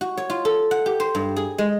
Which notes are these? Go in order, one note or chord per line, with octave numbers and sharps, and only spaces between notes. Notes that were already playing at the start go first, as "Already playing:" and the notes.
F#4
C#5
F4
A4
F#5
G4
C5
G2
G#4
G#3